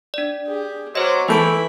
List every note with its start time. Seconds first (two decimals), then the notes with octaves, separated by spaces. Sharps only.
0.14 D4 D5
0.46 G4 G#4
0.95 F#3 C5 D#5 C6 D6
1.28 E3 A3 E4 B4 B5 G6 D7